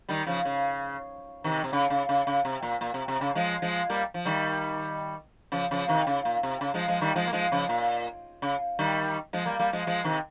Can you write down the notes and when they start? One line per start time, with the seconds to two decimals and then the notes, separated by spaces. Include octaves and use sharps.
0.09 D#3 G3
0.27 C#3 F3
0.45 C#3
1.44 C3 D#3
1.64 C3
1.73 C#3
1.90 C#3
2.09 C#3
2.27 C#3
2.45 C3
2.63 A#2
2.81 A#2
2.94 C3
3.08 C3
3.21 C#3
3.35 F3 G#3
3.62 F3 G#3
3.90 G3 A#3
4.14 F3
4.25 D#3 G3
5.52 C#3 F3
5.71 C#3 F3
5.88 C3 D#3
6.07 C#3
6.25 A#2
6.43 C3
6.61 C#3
6.74 F3 G#3
6.88 F3 G#3
7.01 D#3 G3
7.16 F3 G#3
7.27 A#3
7.33 F3 G#3
7.52 C#3 F3
7.69 A#2
8.42 C#3
8.79 D#3 G3
9.33 F3 G#3
9.46 G3 A#3
9.59 G3 A#3
9.73 F3 G#3
9.87 F3 G#3
10.04 C3 D#3